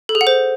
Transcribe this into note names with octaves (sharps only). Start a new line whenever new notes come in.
A4
G#4
F#5
C5